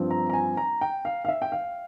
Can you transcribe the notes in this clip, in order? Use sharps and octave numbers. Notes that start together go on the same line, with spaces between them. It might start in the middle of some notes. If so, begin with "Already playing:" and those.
Already playing: G2 F3 C4
A#5
A#5
G#5
A#5
G5
F5
F5
E5
G5
F5